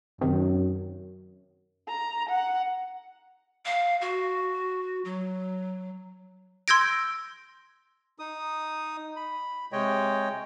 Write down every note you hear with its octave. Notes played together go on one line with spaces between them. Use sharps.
F#2 C3 D#3
A#5
F#5
F5
F#4
F#3
C6 E6 G6 G#6 A#6 D7
D#4 D#6
B5
C3 G#3 C#5 D#5 G5